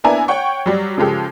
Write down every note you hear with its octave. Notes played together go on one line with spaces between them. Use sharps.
A#3 B3 D4 E4 G#5 A#5
C#5 F#5 G5 C#6
F#3 G3
C#3 F3 G#3 G4 A4